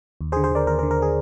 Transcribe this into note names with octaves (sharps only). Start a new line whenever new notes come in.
D#2
G#4 C5
D3
G#4 C5
D3 A#4 D5
D#2 A#4
A#4
D3
A#4
G#4